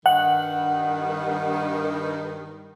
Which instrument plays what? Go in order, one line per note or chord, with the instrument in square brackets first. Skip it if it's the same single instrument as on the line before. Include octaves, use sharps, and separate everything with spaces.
[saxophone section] G2 D#3 [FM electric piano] F#5